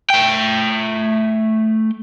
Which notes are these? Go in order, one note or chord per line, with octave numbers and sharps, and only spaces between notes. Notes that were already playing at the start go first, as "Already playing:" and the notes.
A3 G5